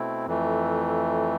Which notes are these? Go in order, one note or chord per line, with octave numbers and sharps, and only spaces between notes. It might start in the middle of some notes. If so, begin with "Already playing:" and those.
Already playing: B2 A3 C4 E4
F2 E3 A3